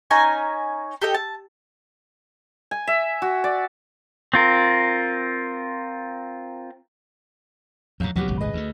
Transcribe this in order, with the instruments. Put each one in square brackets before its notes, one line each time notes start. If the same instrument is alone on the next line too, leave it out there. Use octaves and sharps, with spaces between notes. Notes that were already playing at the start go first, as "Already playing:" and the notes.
[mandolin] C#4 D#4 G#5 A#5
G4 A4 D#5 G5
A5
[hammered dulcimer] G#5
E5
F#4
D5
[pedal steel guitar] C4 F4 A#4
[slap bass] E2 G#2 [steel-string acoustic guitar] F#3 F5 A#5
[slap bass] D2 A#2 [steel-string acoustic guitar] F#3 B3 G4
[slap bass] D#1 G#1 C#2
[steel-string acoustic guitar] G#4 B4 D#5
[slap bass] D2 F#3 A3